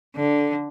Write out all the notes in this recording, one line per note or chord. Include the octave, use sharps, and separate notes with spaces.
D3